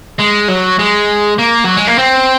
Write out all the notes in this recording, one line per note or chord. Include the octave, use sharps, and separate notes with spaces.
G#3
F#3
G#3
A#3
F#3
G#3
A#3
C4